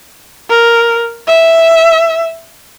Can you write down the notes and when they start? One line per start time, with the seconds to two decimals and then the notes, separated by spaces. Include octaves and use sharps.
0.50 A#4
1.28 E5